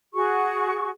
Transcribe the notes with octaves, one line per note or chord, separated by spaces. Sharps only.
F#4 G#4 C#6